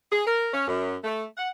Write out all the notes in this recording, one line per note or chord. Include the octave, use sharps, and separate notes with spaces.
G#4
A#4
C#4
F#2
A3
F#5